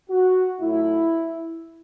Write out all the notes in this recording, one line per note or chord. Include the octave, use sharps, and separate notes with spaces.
F#4
A2 F#3 A3 E4